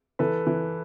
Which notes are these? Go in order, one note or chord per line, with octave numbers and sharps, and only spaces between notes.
E3 A4 B4
E3